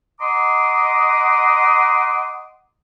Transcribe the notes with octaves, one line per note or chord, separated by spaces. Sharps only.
D#5 F#5 A#5 C6 D6 D#6